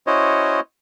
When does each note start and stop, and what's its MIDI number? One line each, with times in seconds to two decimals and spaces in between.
0.07 0.60 61
0.07 0.60 64
0.07 0.60 66
0.07 0.60 72
0.07 0.60 73
0.07 0.60 75